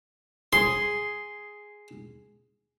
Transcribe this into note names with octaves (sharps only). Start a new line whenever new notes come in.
G#4 C6